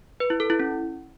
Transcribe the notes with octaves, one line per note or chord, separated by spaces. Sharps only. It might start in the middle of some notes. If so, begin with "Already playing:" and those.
B4
E4
A4
E4
C#4